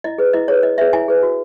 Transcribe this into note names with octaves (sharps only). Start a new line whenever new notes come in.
E4 D#5
G#4 B4
E4 D#5
G#4 B4 C#5
E4 D#5
G#4 B4 E5
E4 G#5
G#4 B4
F#4